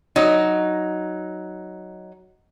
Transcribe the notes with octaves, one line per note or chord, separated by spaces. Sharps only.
F#3 D#4